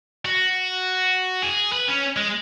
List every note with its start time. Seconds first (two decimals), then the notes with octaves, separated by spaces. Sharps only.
0.25 F#4
1.43 G#4
1.72 B4
1.88 C#4
2.16 G#3